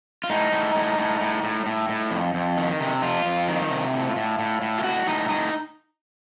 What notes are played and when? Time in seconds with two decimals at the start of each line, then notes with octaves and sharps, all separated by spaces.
0.24 F4
0.30 A2 D#4
0.52 A2
0.75 A2
0.98 A2
1.21 A2
1.43 A2
1.66 A2
1.89 A2
2.11 F2
2.34 F2
2.57 D#3
2.80 C3
3.02 F2 F4
3.25 F2
3.48 D#3
3.71 C3
3.93 A2
4.16 A2
4.39 A2
4.62 A2
4.79 F4
4.84 A2 F#4
5.06 A2 D#4
5.29 A2 D#4